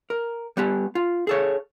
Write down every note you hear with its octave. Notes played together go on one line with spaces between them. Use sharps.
A#4
G3 B3 G4
F4
G#4 A4 C#5